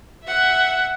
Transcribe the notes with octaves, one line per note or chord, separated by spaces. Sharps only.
E5 F#5